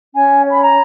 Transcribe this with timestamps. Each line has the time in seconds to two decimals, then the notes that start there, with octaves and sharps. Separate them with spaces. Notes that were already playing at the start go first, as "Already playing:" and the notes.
0.13 C#4 G#5
0.45 C#5 B5
0.60 A#5